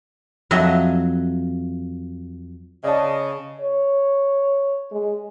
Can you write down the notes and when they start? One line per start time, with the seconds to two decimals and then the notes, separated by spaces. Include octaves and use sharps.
0.51 F2 F#3 D#5 E5
2.84 C#3 D5 D#5 A5
3.61 C#5
4.92 G#3